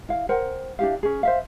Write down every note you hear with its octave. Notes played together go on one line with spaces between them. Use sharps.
E4 F5
A#4 C5 F#5 G5
D4 E4 G4 F5
C#4 G#4
C5 E5 F5